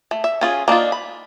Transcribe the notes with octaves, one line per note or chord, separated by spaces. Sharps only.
A3
E5
C#4 F4 G#4
A#3 D4 D#4 F4
B5